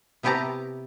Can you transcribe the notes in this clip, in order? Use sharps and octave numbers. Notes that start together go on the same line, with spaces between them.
C3 B3 E4 G4 A5 A#5